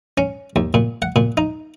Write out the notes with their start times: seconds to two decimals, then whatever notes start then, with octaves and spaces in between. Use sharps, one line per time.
0.18 C#4
0.56 D#2
0.74 A#2
1.02 F#5
1.16 A#2
1.37 D#4